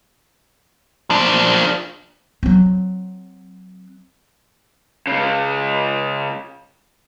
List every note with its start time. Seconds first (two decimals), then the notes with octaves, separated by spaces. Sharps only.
1.10 F3 D4
2.43 F#3 C4
5.07 C#3 G#3